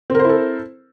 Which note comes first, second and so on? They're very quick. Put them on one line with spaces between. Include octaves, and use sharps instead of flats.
C4 A#4 C5 E4 A4